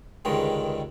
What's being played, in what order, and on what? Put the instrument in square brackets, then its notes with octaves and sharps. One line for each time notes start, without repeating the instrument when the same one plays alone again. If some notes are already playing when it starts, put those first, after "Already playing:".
[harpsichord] C#2 G2 D3 D#3 G#3